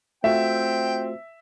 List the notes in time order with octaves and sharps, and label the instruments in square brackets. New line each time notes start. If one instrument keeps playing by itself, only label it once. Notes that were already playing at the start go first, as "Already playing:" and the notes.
[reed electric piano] A3 F4 F#4 [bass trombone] C4 [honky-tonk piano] E5 [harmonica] G5